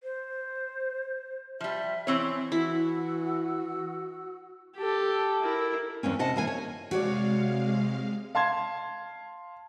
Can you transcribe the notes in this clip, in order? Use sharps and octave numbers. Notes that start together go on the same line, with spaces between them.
C5
F3 G3 E5
E3 C4 C#5
E3 E4 F#4 F#5 E6
G4 A4
E4 A#4
E2 G2 C4 C#4
C3 D#5 F#5 A5
E3 A#3 G#5
C#5
C3 G#3 F#4 C#5 D5 F5
F5 A5 C6 G#6